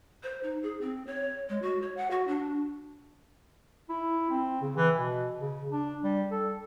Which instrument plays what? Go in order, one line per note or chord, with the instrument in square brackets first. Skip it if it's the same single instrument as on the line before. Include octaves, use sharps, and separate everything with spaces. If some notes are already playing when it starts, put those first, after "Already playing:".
[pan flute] C5
D#4
G#4
C4
C#5
G#3
F#4
C#5
F#5
F#4
D4
[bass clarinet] E4
C4
C#3
E3
B2
C#3
D4
G3
A4